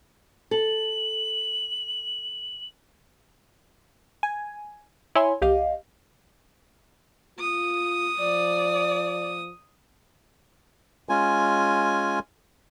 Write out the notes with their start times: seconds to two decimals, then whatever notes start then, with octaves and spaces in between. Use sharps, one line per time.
0.51 A4 F#7
4.23 G#5
5.15 E4 C#5 G#5 C6
5.42 C2 G4 D#5 F5
7.39 F4 D#6
8.19 F3 D5
11.09 G#3 C#4 F4 G#5